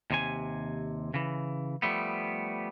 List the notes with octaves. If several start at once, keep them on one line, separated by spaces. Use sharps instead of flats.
D#2 C3 G#5
C#3 E3
F3 G3 A3 B3